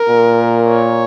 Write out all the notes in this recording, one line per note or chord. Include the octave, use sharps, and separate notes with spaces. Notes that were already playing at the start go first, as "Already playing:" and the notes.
Already playing: A#4
A#2
C#5